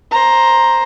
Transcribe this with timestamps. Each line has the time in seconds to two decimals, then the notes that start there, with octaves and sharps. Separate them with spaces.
0.11 C5 A#5